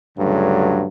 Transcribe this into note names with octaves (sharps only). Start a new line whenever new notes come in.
C#2 G2 D3 F#3 A3